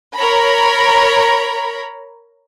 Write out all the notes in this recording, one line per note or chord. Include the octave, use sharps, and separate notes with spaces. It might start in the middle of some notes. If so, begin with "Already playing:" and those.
A#4 C#5 A#5 B5